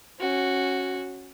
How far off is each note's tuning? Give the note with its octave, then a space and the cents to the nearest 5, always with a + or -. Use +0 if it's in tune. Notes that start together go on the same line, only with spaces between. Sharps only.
C#4 -15 F#4 +0